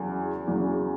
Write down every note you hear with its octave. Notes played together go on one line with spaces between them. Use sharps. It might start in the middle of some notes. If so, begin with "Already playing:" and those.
Already playing: E2 C#3 F#3
E2 C#3 F#3